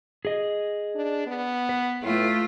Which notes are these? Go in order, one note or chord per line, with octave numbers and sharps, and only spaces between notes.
G#4 D#5
D4
B3
B4
A2 A3 F4